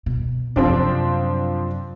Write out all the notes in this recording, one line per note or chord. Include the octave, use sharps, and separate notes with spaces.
B2
F#2 C3 F3 C4 D4